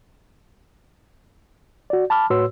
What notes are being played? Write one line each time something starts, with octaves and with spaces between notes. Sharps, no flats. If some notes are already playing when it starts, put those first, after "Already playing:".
F#4 D5
A5 B5 D6 F6
A2 F#4 B4 C#5 C6 E6